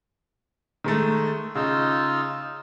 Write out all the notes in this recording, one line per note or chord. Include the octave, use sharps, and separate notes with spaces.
D#3 G#3 A3
C#3 D#4 F4 E6